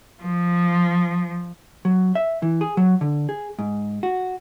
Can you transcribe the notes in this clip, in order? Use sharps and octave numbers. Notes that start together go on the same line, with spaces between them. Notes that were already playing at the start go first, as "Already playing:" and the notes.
F3
F#3
E5
E3
G#4
F#3
D3
G#4
G#2
F#4